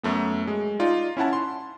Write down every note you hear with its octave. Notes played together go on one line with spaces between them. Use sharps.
F#2 A3 B3
G#3
D#4 F4 D5
C#4 E4 F#5 A5
C6